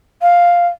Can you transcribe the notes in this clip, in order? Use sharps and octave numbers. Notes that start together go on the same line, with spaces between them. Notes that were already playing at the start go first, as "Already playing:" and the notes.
F5